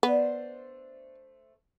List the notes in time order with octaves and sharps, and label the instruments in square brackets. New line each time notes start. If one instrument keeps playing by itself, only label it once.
[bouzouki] A3 D4 C5 [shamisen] B3